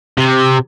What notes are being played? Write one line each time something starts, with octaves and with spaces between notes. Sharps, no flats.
C3